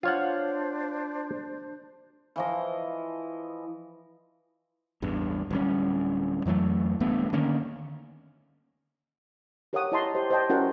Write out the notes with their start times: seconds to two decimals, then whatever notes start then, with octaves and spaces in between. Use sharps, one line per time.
0.03 D4 F4 C5 C#5 F#5
2.36 E3 F3 D#5
5.02 A1 E2 G2
5.51 D1 G3 C#4
6.46 F2 E3 F#3 A3
7.00 D1 G2 A3 B3
7.33 D3 D#3 A#3 C#4
9.73 G4 A#4 C#5 F5 F#5 D#6
9.92 E4 C#5 D#5 A5 A#5 C6
10.14 G4 C5 D#5
10.30 C5 D5 D#5 G5 A5
10.50 C#4 E4 F#4 A#4 F#5 G5